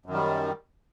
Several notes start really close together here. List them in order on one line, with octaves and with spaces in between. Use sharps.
F#2 D#3 G3